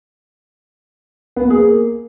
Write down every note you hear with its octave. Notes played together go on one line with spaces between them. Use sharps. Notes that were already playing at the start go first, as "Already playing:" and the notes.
B3
A#3
G#4
A#3